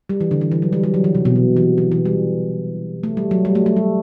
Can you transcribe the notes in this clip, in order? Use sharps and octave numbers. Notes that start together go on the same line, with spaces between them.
G3
E3
D3
E3
E3
F#3
G3
G3
F#3
E3
C3
B2
C3
E3
E3
E3
G3
A3
G3
F#3
G3
A3
A3
G3